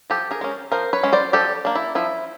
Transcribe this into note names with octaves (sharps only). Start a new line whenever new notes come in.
F3 G4 A4
G#4 A#4
G#3 C#4
F3 A#4 C5
B4 C#5
G#3 C#4
C5 D5
F3 G4 A4
A#3 D4
E4
F3 E4